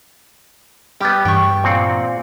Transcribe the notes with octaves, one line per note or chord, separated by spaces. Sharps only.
G3 B3 G4 D6 D#6
G2 E3 D4 G5 C#6
A#2 C4 F#5